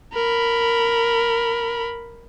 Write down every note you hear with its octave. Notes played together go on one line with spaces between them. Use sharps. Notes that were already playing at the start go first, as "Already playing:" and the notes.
A#4 B5